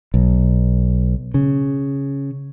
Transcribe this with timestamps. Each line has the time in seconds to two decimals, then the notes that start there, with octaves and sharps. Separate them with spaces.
0.14 B1
1.34 C#3